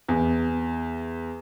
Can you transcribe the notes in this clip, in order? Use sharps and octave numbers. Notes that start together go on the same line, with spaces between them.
E2